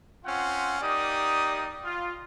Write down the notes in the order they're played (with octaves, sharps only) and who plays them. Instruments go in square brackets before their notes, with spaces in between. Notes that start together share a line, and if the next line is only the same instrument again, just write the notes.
[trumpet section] C4 C#4 F4 F#5
A#3 D#4 G4 D5 D#6
F4